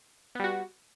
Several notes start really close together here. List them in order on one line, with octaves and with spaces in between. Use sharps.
B3 G3 F#4